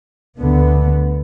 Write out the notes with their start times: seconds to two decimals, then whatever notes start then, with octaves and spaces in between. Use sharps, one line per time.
0.38 D2 D3 B3